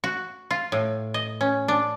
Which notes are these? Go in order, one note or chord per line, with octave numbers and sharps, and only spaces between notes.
F#4
F4
A2
D#5
C#4
D4